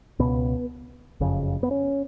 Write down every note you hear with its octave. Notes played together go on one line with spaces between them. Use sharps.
C#2 B2 B3
F#1 F2 C#3
B3
C#4